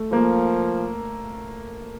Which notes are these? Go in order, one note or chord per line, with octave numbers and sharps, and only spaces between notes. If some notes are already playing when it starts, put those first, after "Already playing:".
Already playing: A3
F3 A#3